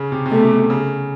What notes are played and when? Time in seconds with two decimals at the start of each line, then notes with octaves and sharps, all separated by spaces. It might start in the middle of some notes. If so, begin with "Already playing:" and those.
Already playing: C#3
0.12 C3
0.26 C3
0.32 B2 A3
0.44 C3
0.58 C3
0.70 C#3